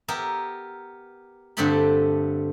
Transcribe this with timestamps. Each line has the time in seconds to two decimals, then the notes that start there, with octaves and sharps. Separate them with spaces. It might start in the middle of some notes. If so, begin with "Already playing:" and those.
0.08 B3 G4 A#4 E5
1.57 G2 D3 A3 C4 G4 B5